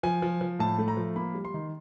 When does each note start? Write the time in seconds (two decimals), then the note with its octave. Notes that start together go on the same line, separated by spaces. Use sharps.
0.03 F3 G#5
0.22 F3
0.41 F3
0.59 A2 A5
0.79 A3
0.88 A#5
0.97 F3
1.16 A#3 B5
1.34 G3
1.45 C6
1.54 D#3